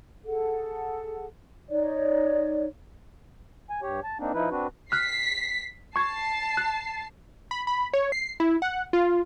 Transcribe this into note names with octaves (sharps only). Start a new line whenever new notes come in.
G#4 A4 F#5
D#4 C#5 D5
G#5
G2 G4 C#5
A5
A#3 C4 D4 D#4
F3 D#4 E4 B4
C4 D4 F#4 B4
F6 F#6 B6 C7
A5 C#6 G#6 C7
F#6
B5
B5
C#5
C7
E4
F#5
F4